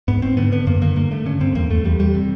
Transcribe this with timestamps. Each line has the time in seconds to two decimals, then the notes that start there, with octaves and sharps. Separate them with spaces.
0.08 G#2 B3
0.22 G#2 C4
0.37 D3 B3
0.52 D3 B3
0.67 F#2 A#3
0.82 D3 A#3
0.96 G2 A#3
1.11 D3 A3
1.26 D3 C#4
1.40 G2 C4
1.55 E2 A#3
1.70 E2 A3
1.84 E2 G3
1.99 E2 G3
2.14 C3